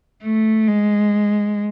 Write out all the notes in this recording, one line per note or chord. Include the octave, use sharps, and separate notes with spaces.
A3
G#3